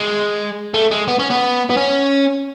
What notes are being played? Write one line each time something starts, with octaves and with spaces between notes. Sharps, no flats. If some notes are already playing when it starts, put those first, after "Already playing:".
Already playing: G#3
A3
G#3
B3
C#4
B3
B3
C#4